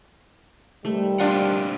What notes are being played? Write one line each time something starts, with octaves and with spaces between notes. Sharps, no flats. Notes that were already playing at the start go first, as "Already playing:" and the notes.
C3 D#3 G3 A3
A#2 D3 D4 F4 F#5